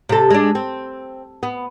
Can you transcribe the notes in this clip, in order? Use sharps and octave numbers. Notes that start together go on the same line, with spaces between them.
C3 A4
G#3 D4
C4
B3